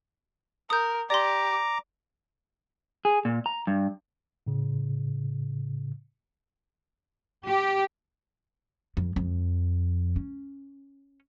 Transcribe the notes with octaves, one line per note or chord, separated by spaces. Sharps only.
A#4 D#6 G6
G4 D5 A#5 C6 D6
G#4
A#2
A#5
G2
A2 C#3
G4
F2
F2
C#4